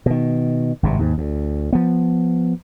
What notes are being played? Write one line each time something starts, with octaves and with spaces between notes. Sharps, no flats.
B2 D#3
G#1 G2 C3
D#2 G#2
D2
F3 B3